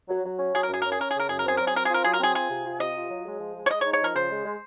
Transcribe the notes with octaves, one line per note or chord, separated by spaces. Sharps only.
F#3
F#3
C#4
F#3 G#4
A#4
F#2 G#4
C#4 A#4
G#4
C#4 A#4
C#3 G#4
A#4
F#2 G#4
A#4
C4 G#4
F#3 A#4
G#4
C4 A#4
G#4
F4 A#4
F#3 G#4
A#4
C4 G#4
F4 G#4
C3
F4
C3 D#5
F4
F#3
G#3
F3
G#3
C#5
G#3 D#5
C#5
D#4
C#5
F3 A#4
C#3 C5
G#3
G#3